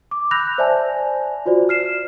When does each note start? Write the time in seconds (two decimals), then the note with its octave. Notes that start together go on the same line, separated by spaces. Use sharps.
0.11 D6
0.31 B5 E6 F#6 G6 A#6 F7
0.58 C5 D5 E5 G#5 A5
1.46 F4 F#4 C5 D5
1.69 F6 C7 E7